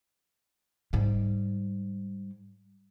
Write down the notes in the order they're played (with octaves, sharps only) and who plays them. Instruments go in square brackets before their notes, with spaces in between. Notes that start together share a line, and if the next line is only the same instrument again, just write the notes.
[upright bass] G#2 G3